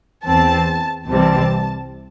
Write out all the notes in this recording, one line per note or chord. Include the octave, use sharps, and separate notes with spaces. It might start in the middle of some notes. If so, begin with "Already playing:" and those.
E2 E3 C4 A5
C2 C3 E3 G3 C4 A5